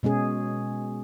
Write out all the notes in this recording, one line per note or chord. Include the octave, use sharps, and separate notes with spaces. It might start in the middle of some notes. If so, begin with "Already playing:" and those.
B2 G#3 C#4 G#4